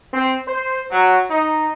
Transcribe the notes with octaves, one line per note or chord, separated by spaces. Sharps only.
C4
C5
F#3
D#4